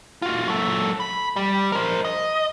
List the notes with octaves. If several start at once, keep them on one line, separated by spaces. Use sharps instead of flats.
F4 F#4
F#3 A4
B5
G3
A#4 C5
D#5